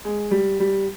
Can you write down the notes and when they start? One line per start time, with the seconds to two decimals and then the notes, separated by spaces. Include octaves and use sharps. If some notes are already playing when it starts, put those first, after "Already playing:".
0.05 G#3
0.31 G3
0.60 G3